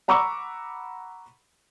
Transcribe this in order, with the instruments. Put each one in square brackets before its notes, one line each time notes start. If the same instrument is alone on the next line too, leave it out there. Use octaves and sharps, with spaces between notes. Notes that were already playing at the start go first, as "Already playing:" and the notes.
[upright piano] F#5 A#5 B5 C#6 D6 E6